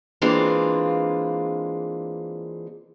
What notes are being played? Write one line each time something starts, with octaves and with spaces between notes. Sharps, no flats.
E3 G#3 A#3 C4 D4 F4